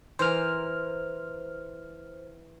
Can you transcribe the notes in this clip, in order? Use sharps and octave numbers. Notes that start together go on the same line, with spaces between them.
E3 A#4 C5 F6